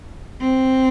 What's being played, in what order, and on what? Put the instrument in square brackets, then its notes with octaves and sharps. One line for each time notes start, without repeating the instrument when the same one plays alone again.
[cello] C4